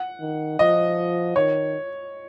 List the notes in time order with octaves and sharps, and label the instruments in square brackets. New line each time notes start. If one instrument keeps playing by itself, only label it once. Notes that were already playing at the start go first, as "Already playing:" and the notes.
Already playing: [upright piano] F#5
[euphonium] D#3
[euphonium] F3 [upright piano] D#5
[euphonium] D#3 [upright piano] C#5